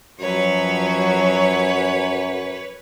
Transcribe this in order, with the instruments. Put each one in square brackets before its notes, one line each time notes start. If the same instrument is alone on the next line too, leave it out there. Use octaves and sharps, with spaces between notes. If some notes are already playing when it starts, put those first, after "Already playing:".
[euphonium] F#2 [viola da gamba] F3 F#3 [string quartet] B4 C#5